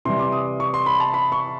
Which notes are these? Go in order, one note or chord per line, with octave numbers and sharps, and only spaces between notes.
C3 E3 G3 C6
D6
D#6
C#6
C6
B5
A5
B5
C#6